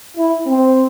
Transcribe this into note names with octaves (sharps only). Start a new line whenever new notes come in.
E4
C4